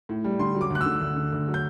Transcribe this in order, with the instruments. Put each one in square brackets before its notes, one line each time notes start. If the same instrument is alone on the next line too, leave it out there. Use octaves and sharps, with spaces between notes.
[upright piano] A2
G3
D3 C6
F#3
D6
D2 F#6
D3 E6
D2
D3
D2
F#3
G6